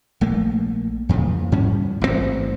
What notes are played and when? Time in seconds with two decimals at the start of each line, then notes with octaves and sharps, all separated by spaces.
0.21 A#1 A3 A#3
1.09 F2 A#2 C#3 E3
1.52 G#2 G3 C#4
2.02 A1 G#2 B2 C4